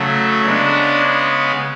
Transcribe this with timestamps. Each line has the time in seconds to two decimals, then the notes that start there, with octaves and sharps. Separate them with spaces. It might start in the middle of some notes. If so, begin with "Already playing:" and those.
Already playing: C#3 F#3 A3
0.45 C#3 G#3 B3 D4